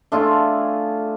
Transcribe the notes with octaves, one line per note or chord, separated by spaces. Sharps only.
A3 D4 F4 G#4